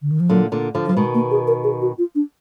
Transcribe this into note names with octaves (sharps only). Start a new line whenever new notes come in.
D3
D#3
F3
A#2 D3 F#3
A#2 D3
D3 F3
F3 F#3
B2 D#3 G#3
A#3
G#4
A#4
G#4
F#4
F4
D4